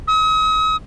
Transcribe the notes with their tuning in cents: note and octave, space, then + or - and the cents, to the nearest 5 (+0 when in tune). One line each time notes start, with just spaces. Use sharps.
D#6 +40